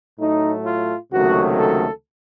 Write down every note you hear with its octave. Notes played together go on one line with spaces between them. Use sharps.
A2 F#3 A3 D#4
F4
C#2 C3 D#3 F#3 A3 F#4
A4